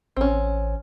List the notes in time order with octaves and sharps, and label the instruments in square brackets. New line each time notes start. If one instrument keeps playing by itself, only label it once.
[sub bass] A1 [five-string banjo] C4 C#4